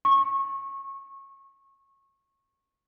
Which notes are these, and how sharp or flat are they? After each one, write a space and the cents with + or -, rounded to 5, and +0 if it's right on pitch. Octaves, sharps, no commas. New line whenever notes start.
C#6 -25